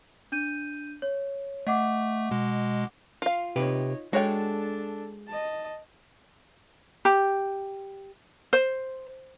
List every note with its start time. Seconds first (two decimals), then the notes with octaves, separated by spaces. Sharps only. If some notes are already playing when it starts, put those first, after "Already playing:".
0.32 D4 G6 D#7
1.02 C#5
1.67 A3 D#5 F#5 D6
2.31 B2 G#3
3.22 F4 F5
3.56 C3 D#4 G4 B4 C#5
4.13 G#3 D4 F#4 A4 C#5 G5
5.28 D#5 A5
7.05 G4
8.53 C5